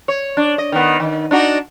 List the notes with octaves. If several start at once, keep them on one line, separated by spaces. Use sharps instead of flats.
C#5
D4
D#5
D#3 B3
D#3
D4 D#4 F#4